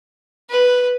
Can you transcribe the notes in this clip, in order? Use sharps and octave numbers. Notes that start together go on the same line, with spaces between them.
B4